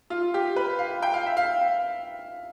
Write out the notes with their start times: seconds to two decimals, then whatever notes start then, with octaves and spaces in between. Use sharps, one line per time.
0.10 F4
0.34 G4
0.56 B4
0.79 F5
1.02 G5
1.14 F5
1.26 E5
1.37 F5